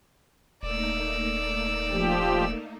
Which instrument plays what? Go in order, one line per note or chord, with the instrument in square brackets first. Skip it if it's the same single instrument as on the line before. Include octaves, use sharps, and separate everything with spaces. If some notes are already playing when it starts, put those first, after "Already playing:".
[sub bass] D#1 [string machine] A3 A#3 D#4 [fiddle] D5 E6
[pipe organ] F3 G4